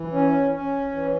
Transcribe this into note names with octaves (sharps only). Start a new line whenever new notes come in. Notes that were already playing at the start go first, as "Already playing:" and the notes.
Already playing: E3
C#4
C#4
E3